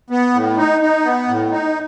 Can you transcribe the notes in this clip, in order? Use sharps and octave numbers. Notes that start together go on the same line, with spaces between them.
B3
A2
D#4
D#4
B3
A2
D#4